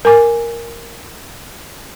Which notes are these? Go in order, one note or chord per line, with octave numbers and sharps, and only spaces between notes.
A#4 G#5 D6